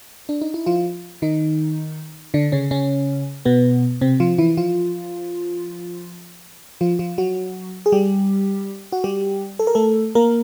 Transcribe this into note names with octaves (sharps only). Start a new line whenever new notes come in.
D4
D#4
E4
F3 F4
D#3 D#4
D3 D4
C#3 C#4
C#3 C#4
B2 B3
C3 C4
F3 F4
E3 E4
F3 F4
F3 F4
F3 F4
F#3 F#4
G#4
G3 G4
F#4
G3 G4
A4
A#4
A3 A4
A#3 A#4